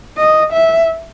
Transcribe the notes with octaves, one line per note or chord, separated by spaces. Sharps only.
D#5
E5